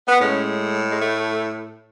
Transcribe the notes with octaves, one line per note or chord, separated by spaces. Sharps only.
B3
A2 G#3 C#4
G#3
A3